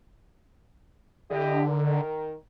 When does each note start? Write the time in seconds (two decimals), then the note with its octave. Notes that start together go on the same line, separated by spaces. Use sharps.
1.31 D3 E4 G4 D#5
1.68 D#3 A#4